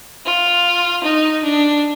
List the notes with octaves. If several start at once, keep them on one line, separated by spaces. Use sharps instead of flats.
F4
D#4
D4